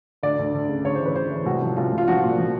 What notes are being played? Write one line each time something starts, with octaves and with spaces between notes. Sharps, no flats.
D2 D5
D2
D2
C#3
D2 C#5
E3 C5
B4
D2 C5
E3
C2 F#4
F3
C2 F4
C2 F4
F3 F#4
A#2
F3